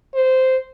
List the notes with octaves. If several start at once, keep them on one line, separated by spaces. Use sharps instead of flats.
C5